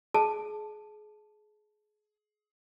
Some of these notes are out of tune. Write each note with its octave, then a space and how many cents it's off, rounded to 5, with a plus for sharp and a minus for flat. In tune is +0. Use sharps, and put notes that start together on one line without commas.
G#4 +30 A5 +0